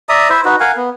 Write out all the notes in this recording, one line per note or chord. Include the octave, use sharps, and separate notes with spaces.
D5 E5 A#5 D#6
E4 C5 E5
D#4 F#4 B4
A#4 F5 F#5 G#5
B3